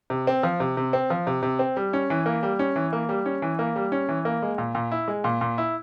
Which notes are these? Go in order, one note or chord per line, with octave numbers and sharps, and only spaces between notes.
C3
C4
F3
C3
C3
C4
F3
C3
C3
C4
G3
C#4
E3
A#3
G3
C#4
E3
A#3
G3
C#4
E3
A#3
G3
C#4
E3
A#3
G#3
A#2
A#2
E4
G#3
A#2
A#2
E4